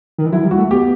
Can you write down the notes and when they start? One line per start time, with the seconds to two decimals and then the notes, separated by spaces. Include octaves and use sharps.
0.18 D#3
0.26 E3
0.32 F#3 E4
0.45 G3
0.51 F#4
0.58 A3
0.71 B3 G4